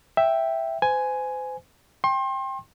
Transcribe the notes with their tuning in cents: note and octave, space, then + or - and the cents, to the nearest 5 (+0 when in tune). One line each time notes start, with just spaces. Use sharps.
E5 +0 G5 +0
C5 -35 G#5 +5
G5 +10 C6 +35